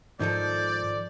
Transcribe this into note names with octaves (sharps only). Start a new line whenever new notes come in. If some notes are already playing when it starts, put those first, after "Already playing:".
G#2 D#3 F3 A4 D5 G6